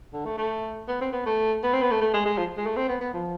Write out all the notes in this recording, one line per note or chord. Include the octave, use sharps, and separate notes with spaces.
D3
A3
A3
B3
C4
B3
A3
B3
C4
B3
A3
A3
G#3
G#3
F3
G#3
A3
C4
B3
B3
F3